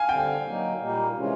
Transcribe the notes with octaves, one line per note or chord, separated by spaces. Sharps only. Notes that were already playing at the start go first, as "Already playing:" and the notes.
Already playing: F5 G#5
D3 G3 C4 G5
F#3 A#3 D#4
A#2 G3 A#3 D#4
C3 E3 G#3 C#4 F4